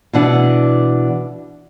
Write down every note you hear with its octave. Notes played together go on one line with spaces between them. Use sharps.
B2 E3 D4 F#5